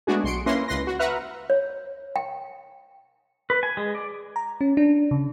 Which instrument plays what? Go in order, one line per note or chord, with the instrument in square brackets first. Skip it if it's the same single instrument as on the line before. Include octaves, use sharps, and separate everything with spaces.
[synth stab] G#3 A3 B3 D4 F#4 G#4
B1 C6 C#7 D7
A#3 C#4 E4 B4 C6 A#6
C#2 B4 C6 A#6
F#4
B4 E5 F#5 A#5 F6 F#6
[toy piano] C#5
G5
[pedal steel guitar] B4
G#5
G#3
D5
[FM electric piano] A#5
C#4
D4
C#3